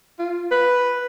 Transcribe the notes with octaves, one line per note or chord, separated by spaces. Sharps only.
F4
B4